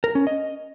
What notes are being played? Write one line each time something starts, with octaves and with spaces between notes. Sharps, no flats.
A#4
C#4
D#5